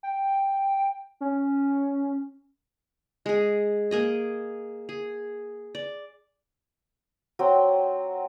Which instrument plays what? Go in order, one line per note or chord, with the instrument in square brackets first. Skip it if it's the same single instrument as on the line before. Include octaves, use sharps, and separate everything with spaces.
[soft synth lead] G5
C#4
[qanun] G#3 G#4
A#3 G#4 D#5
G#4
D5
[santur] F#3 C4 G5